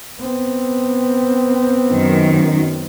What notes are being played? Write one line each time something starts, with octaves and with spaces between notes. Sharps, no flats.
B3 C4
F#2 D#3